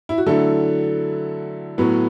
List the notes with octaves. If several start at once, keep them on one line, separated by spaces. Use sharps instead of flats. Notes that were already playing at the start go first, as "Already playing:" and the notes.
E4
F#4
D3 F#3 A3 E4 A4
A2 F#3 B3